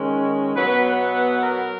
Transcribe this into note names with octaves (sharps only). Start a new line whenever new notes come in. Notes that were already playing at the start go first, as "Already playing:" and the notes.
Already playing: D#3 G#3 C#4
B2 F#3 B3 B4
B4
A#4